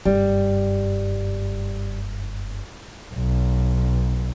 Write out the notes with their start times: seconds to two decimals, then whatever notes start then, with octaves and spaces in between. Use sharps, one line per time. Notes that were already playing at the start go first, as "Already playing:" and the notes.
0.05 F#1 G2 G3
3.13 B1